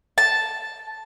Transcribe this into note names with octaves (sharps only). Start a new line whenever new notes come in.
A5